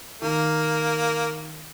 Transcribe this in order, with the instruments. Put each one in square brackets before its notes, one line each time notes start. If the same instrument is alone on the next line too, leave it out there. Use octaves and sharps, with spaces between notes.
[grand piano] D#3 [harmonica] A#3